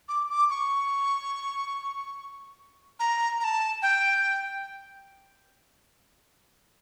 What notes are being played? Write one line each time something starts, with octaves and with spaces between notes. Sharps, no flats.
D6
D6
C#6
A#5
A#5
A5
G5